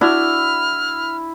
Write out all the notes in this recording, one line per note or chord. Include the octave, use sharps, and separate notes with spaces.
D4 E4 F#4 F6